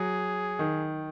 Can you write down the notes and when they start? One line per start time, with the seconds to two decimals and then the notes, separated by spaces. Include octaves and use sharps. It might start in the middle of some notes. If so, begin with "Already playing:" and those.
Already playing: F#3 G#4
0.59 D#3